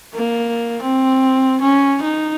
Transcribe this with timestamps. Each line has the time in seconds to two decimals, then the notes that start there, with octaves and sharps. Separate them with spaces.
0.15 A#3
0.83 C4
1.61 C#4
2.02 D#4